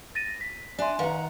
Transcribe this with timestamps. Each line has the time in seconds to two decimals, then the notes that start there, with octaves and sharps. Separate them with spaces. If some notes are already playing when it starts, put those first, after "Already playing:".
0.15 A6 A#6 D#7
0.41 B6
0.79 D4 D5 E5 G#5 C6
0.99 D#3 B4 F5 F#5 A#5